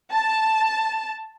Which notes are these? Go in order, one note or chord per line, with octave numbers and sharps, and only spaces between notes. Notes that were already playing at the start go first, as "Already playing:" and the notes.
A5